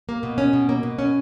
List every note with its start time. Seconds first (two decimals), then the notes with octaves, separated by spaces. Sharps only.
0.09 A#3
0.23 B2
0.38 C#4
0.53 B2
0.69 A#3
0.83 B2
0.99 C#4